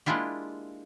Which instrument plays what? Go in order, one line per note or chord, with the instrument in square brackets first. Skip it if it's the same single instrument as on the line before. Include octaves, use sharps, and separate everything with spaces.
[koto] G#3 A#3 D4 E4 F4 G4